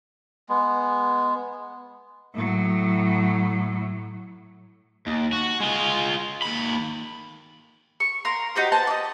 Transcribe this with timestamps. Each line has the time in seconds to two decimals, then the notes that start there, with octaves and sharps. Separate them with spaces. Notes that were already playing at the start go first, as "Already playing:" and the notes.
0.49 G#3 B3
2.34 A2 F#3
5.07 D#2
5.33 F#4
5.60 G#3 F4
6.42 D#2 B5
8.00 C#6
8.25 A#4 F5 C6
8.56 D#4 F#4 G4 C5
8.72 B4 C5 A5
8.87 D5 D#5